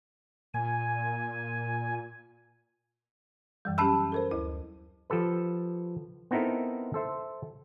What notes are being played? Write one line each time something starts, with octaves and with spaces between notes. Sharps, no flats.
A#2 G#5
F#2 E3 G3
F#3 C#4 G4 A5 B5 E6
A4 A#4 C5
D2 E4
F3 G4 A4 B4
B3 C4 D#4 E4 A4 A#4
A4 C5 E5